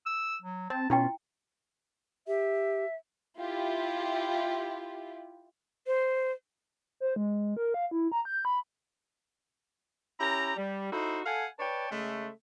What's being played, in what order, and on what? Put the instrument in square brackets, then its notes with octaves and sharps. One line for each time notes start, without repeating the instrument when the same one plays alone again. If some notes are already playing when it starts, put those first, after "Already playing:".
[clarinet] E6
F#3
[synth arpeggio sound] C4 [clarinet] A5
[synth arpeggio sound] B2 C#4 [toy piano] E4 G5 [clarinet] F4
[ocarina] G4 [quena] E5
[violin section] E4 F4 G4
[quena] C5
[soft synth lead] C5
G#3
A#4
F5
E4
A#5
G6
B5
[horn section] C#4 E4 G4 A#5
G3
D#4 E4 F#4 A4 C5
A4 F5 F#5 G#5
B4 C#5 D5 G5 A5
C#3 G#3 A3